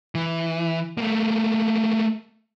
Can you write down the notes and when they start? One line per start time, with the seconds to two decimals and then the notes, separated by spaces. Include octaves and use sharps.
0.15 E3
0.98 A3 A#3